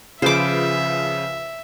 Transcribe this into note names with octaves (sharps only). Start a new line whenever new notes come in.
C#3 F3 F4 G#4 B4 C5 E5 D6